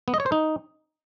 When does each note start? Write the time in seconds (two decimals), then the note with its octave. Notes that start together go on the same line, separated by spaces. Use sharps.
0.08 B3
0.14 D#5
0.20 C#5
0.26 C5
0.32 D#4